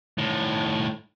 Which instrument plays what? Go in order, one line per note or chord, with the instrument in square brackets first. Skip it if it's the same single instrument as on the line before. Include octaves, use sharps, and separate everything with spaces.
[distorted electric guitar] A2 D#3